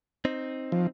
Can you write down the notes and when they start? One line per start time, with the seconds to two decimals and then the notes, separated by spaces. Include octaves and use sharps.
0.25 C4 D#4
0.72 F3